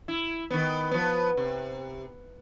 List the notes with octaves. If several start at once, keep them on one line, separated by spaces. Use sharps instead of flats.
E4
D#3 B3
F3 B3
C3